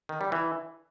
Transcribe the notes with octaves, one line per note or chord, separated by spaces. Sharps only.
D#3
G3
E3